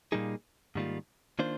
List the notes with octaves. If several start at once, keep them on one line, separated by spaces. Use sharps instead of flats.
A#2 G3 A#3 D#4 G#4
G#2 D#3 G3 A#3 F4
D#3 A#3 D4 F4 C5